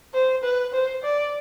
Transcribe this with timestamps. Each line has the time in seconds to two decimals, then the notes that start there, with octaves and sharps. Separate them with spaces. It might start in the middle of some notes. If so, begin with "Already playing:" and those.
0.14 C5
0.44 B4
0.73 C5
1.04 D5